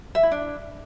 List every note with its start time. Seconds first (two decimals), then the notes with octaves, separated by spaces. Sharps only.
0.15 E5
0.23 E4
0.32 D4